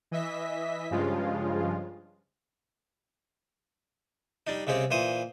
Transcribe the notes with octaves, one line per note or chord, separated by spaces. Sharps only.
E3 D#5 E5 B6
G2 C#3 F3 G#3 F4
G3 D4 D#4
C2 C#3 G#3 C4 G4
A#2 E3 C5 D#6